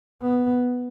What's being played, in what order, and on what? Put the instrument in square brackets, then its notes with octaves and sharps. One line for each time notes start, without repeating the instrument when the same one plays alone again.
[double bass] B3